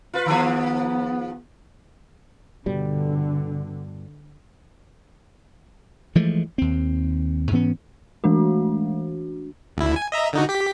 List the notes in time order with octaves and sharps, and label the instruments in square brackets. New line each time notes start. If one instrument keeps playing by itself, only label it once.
[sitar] F4 B4
[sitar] D#3 F3 G#4 [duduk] B3
[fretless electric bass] G2 B2 G3 [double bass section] D3
[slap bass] E3 F3 G#3 A3
D#2 C4
G#2 E3 B3 C#4
[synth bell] E3 G#3 A3 D4 F#4
[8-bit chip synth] D2 E4
G#5
D#5 E5 A#5
D3 D#4 F#4
G4 B6